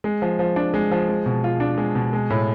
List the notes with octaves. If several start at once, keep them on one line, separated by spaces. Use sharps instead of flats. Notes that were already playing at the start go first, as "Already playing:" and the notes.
G#3
F3
F3
D4
G#3
F3
G#3
B2
F4
D4
G#3
B2
G#3
A2